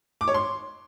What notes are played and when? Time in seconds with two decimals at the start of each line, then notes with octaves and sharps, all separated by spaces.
0.21 D6
0.28 C#5
0.34 C6